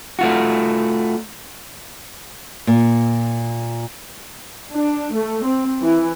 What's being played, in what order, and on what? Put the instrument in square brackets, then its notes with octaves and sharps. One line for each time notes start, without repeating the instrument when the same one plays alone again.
[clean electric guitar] A3 F4 F#4
[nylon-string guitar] A#2
[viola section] D4
A3
C4
E3